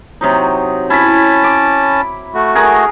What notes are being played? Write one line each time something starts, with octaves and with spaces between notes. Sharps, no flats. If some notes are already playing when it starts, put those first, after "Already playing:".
C3 F#3 D#4
C#4 E4 A5 B5
D6
A3 F#4
G#4 A#4 F#5